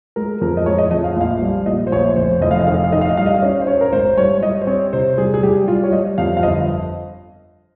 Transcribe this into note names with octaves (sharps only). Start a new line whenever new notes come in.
G#3 A#4
F2 A#4
D#5
G#3 C#5
D#5
F2 D#5
F5
A#1 F5
G3
A#1 D#5
C5
A#1 C#5
F1 C5
F1 D#5
F5
D#5
D#3 F5
D#5
F5
D#3 D#5
F5
D#5
G3 F5
D#5
F5
C#4 D#5
C5
C#4 C#5
A#4
G#1 C5
G3 C#5
G3 D#5
C5
C4 C#5
C3 C5
G3 G#4
G#4
G3 G4
G3 F4
C#5
G3 D#5
F2 F5
F5
G1 D#5